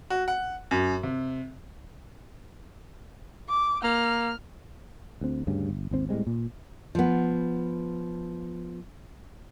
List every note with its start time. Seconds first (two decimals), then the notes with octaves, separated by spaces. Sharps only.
0.10 F#4
0.28 F#5
0.71 F#2
1.03 C3
3.49 D6
3.84 A#3 F6
5.21 D2 C4
5.47 D2 G2 C#3
5.69 G1
5.91 G#1 D#2 C4
6.09 A2 G3 G#3 C4
6.27 A#2
6.95 F3 B3